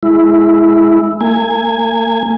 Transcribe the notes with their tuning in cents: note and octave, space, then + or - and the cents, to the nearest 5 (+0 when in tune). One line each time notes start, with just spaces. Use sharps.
G#3 +10 E4 +0
A#3 -40 G#5 +0